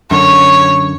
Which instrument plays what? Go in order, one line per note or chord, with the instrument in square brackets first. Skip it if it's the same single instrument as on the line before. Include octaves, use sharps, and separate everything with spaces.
[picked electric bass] F#2 D3 [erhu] C#5